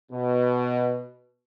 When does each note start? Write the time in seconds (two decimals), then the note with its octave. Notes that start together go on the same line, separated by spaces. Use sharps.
0.11 B2